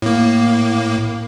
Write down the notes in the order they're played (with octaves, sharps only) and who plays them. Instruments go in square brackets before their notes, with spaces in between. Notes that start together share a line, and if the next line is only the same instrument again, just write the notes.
[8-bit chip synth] A2 A#3